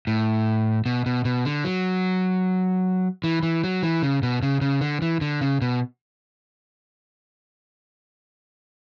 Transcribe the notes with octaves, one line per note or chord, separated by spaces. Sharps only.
A2
B2
B2
B2
D3
F#3
E3
E3
F#3
E3
C#3
B2
C#3
C#3
D3
E3
D3
C#3
B2